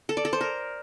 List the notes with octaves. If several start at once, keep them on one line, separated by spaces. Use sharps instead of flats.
A4
D5
A4
C5
A#4